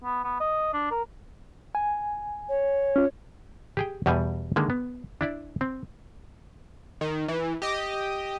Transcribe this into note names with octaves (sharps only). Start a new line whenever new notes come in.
B3
B3
D#5
D4
A#4
G#5
C#5
C#4 F4
G4 G#4 G5
E2 B2 G3 G4 F#5 G#5
D3 D#3 G#3 A#3
B3
D4 E4 D5
C4
D#3
E3
G4 D#5